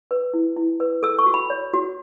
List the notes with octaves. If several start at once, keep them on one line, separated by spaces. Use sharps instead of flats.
B4
E4
E4
B4
A4 E6
C#6
F#4
B5
C#5
F#4